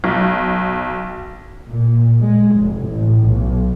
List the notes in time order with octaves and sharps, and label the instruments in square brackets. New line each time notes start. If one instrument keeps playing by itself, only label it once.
[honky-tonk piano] B1
[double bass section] A#2
G#3
F1
A1
B1